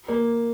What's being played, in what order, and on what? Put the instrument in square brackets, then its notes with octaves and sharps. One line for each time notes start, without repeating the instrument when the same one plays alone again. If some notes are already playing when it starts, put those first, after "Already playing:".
[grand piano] A#3